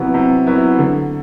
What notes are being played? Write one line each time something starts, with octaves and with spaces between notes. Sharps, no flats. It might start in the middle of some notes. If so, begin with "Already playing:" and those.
Already playing: C3 F#3 B3 E4
C3
F#3 B3 E4
D3